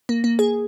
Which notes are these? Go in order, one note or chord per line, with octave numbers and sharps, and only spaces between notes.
A#3
A#3
G#4